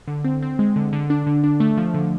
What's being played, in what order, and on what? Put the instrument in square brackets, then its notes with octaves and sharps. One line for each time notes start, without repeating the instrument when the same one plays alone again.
[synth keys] D3
C4
C4
G#3
D3
D3
D4
D3
D4
A3
F3
D3